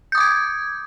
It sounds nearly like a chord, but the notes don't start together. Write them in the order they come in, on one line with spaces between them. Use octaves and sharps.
G6 D#6 D6 G#6